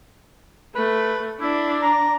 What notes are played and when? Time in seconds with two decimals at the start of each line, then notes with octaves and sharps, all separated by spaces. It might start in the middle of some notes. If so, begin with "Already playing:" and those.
0.75 A3 B4
1.41 D4 E4
1.82 A#5